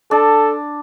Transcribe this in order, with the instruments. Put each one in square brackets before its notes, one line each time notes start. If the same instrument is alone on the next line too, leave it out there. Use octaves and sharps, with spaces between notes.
[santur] D4 [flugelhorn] A4